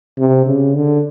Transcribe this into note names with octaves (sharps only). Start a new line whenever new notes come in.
C3
C#3
D3